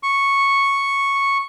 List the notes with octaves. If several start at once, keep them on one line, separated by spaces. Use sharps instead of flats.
C#6